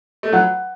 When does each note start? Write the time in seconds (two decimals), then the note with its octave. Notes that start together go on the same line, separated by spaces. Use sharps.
0.23 A3
0.33 F#3 F#5